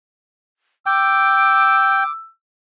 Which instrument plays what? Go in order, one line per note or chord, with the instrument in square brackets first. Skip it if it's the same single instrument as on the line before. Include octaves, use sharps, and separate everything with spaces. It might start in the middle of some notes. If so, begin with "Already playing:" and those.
[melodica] G5 [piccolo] D6 [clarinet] E6